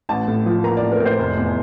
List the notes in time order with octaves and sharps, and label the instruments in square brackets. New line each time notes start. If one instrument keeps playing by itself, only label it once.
[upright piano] A1 A5
A2
F3
A#3 A#5
D5
A1
A#4
A2
C5
F1
E2